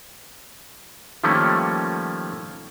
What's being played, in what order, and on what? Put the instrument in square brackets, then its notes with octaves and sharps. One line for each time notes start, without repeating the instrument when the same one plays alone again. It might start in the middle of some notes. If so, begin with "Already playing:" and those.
[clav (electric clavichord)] D#3 F3 G3 A3 A#3 C#4